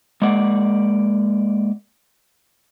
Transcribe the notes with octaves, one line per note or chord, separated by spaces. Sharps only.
G#3 A#3 D5 F#5